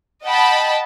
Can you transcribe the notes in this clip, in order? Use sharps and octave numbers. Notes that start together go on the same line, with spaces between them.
D#5 F#5 G5 A5 B5